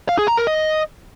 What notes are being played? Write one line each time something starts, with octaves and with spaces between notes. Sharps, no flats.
F5
G#4
A#5
A#4
D#5